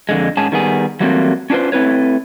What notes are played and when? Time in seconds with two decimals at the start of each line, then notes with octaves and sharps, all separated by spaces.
0.09 F2 D3 G#3
0.37 G#2 C#4 G#4 A5
0.52 D#3 G3 B3 G#4
1.00 E3 F#3 G3 A3 A#3 C4
1.50 C#4 D4 F4 B4 C5
1.72 A3 C4 E4 B4 C#5